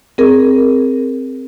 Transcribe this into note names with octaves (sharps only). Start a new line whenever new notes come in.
C4 G#4 A#4